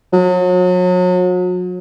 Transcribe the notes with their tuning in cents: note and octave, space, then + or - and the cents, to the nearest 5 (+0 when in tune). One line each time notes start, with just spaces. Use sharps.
F#3 -35